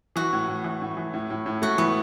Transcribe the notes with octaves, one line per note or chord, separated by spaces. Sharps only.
E3 F#4
A2
A2
E3
A2
E3
A2
A2
A2
A3 F#4
E3 B3